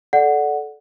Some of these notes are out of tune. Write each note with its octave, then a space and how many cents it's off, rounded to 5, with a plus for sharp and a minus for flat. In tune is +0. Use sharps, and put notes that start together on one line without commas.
A4 -15 D5 +0 F#5 +0